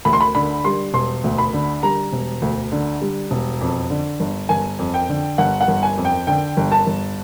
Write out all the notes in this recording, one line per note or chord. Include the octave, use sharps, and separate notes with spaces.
D2 B5
C6
B5
D3 B5
G3 C6
E1 C6
D2
B5
D3
G3 A#5
E1
D2
D3
G3
E1
F2
D3
G1
G1 G#5
F2
G5
D3
G1 F#5
F#5
G1
G#5
F2
G5
D3 G5
G1
A5
G1